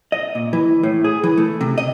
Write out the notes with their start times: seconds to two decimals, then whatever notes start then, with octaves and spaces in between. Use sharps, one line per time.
0.12 D#5
0.35 A#2
0.53 E3
0.83 A2
1.04 G#4
1.24 E3
1.37 A3
1.61 C3
1.78 D#5